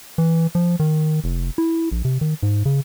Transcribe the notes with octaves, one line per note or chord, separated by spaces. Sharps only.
E3
F3
D#3
F1
E4
A#1
C3
D#3
G#2
C#3